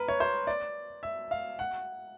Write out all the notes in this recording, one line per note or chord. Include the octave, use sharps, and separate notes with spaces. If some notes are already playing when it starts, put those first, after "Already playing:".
Already playing: A#4 B4
C#5
C5
D5
E5
F5
F#5